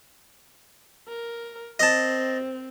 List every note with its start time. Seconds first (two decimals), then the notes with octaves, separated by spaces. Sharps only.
1.08 A#4
1.80 C4 D#5 A5